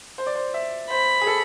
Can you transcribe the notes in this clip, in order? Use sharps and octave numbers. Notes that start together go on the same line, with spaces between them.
C5
D5
C5
E5
C5 B5
G#4
A4